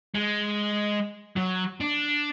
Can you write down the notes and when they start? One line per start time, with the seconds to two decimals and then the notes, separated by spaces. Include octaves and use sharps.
0.15 G#3
1.37 F#3
1.81 D4